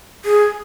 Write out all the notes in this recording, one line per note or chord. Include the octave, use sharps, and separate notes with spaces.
G#4